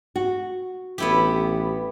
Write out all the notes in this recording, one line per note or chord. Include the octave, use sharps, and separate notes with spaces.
F#4
A1 B3 E4 G4